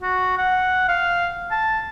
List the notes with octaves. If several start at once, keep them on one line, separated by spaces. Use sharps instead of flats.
F#4
F#5
F5
A5